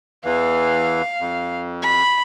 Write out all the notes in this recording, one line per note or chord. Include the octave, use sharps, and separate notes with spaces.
E2 E3 F5
F2
B5